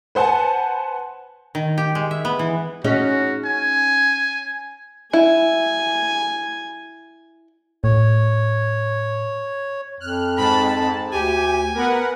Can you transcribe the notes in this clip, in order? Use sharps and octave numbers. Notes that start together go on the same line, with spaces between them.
B4 C5 F#5 G#5 A5
D#3
G4
G#3
E5
B3
E3
C#4 D#4 F#4 G#4
G#5
E4 G#5
A2 C#5
F2 F6 F#6
G#2 A5 B5
D2 G4 G#5
B3 A#4 B4 F#5